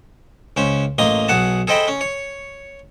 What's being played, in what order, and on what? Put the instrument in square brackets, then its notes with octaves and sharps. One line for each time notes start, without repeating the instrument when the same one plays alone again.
[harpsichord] C#2 C#4 C5
A1 A#3 D#5 C6 D#6
B1 G#4 F#5 A5
G#4 A4 C5 D#5 G5 B5
C#4
C#5